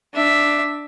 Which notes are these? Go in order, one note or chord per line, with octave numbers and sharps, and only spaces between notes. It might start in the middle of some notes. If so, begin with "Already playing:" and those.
D4 E5